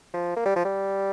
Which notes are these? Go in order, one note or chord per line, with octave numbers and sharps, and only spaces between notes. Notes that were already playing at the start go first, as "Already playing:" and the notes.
F3
A#3
G3
F3
G3